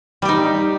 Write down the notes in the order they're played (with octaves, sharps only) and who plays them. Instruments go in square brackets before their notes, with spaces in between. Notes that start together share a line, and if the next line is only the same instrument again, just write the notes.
[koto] G3
G4
D#4